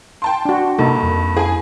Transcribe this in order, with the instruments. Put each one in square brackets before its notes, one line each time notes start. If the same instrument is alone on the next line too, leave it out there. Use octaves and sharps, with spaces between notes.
[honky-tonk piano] G5 A5 C6
[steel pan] D4 F#4
[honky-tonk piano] G2 [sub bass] C3 [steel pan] A#3 D#4 A4
[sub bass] F2
[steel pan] E4 [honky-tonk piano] G#4 G#5